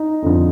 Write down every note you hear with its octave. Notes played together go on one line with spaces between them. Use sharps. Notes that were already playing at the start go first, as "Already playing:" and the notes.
Already playing: D#4
F2 D3 F3